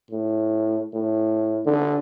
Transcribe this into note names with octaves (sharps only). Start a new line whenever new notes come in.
A2
A2
D3